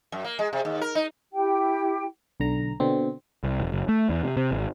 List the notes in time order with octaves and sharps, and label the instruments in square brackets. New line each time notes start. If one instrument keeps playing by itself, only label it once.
[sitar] F#2
A#3
G#3
C3
D#2
A#4
D#4
[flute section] E4 G4 G5
[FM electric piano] B1 D3 A#5
B2 D3 C4
[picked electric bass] C2
E1
F#1
A3
E2
C3
C3
G#1